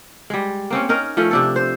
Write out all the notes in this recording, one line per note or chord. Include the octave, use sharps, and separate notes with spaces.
G3 G#3
A#3 C4 C#4
C#4 D#4 A#4
F3 A3 C#4
C3 D4 A4
C5